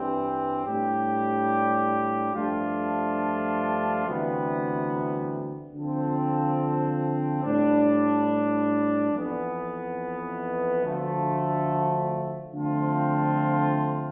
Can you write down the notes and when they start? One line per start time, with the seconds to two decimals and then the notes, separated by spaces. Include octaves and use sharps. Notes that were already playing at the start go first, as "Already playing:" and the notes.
Already playing: G2 E3 G3 C4
0.65 A2 G3 D4 G4
2.34 G2 F3 A3 D4 F4
4.05 D2 C3 E3 G3 B3
5.74 D3 F3 C4 F4 A4
7.43 A2 G3 D4
9.14 F2 E3 B3
10.83 D2 D3 F3 A3
12.53 D3 F3 A3 C4 F4